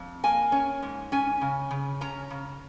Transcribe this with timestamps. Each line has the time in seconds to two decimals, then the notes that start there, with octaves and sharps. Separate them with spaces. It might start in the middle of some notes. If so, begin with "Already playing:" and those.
Already playing: F2
0.24 A#3 G#5
0.52 C#4
0.82 G#2
1.12 C#4 G#5
1.41 C#3
1.71 C#3
2.01 C#4 A#5
2.30 C#3